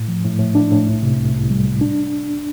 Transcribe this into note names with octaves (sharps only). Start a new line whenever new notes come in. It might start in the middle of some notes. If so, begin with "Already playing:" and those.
Already playing: A2
F3
A2
A2
D4
A2
C2
C3
C2
C2
G3
C2
D4